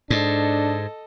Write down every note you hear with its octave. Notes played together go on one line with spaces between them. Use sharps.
G#2 D4 A4 D#5